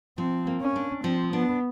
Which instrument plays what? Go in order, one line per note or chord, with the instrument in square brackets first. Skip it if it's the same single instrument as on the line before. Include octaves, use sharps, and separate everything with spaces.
[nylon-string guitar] F3 [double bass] C4
[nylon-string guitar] A#3
[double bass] C#4
[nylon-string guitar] D4
[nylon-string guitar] F3 [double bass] C4
[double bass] B3 [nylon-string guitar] D4